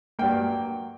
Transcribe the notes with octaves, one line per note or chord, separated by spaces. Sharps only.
G2 F#3 A#3 G5